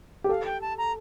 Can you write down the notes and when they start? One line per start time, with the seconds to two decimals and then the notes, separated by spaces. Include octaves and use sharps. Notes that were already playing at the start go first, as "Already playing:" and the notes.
0.24 G4
0.29 A4 F5
0.46 G5
0.61 A5
0.78 A#5